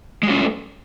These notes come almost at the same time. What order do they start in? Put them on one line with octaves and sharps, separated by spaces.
G#3 F#3 C#4 A3